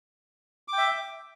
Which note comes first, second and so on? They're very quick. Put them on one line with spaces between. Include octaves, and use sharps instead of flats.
D6 G5 E5